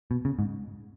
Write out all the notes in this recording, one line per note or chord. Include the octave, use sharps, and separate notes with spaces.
B2
C#3
G#2